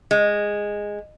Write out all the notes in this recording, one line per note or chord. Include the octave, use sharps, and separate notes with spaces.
G#3